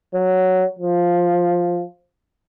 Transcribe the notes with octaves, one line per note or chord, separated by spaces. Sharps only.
F#3
F3